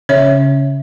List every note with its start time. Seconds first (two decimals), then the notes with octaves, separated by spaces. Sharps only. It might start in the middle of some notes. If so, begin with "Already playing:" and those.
0.09 C#3 C#5 E5